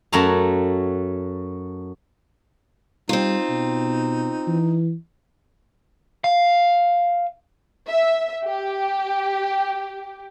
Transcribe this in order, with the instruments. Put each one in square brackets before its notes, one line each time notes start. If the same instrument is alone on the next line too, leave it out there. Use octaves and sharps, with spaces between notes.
[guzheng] F#2 A3 F#4 A5 A#5
[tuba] G3 [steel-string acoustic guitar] C4 F4 [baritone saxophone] D#4
[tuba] B2
E3
[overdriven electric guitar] F5
[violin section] E5
G4